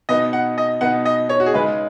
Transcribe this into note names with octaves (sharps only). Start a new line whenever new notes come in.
B2 B3 D#4 D#5
F#5
D#5
B2 B3 D#4 F#5
D#5
C#5
F#4
G#4
C#3 G#3 D#4 B4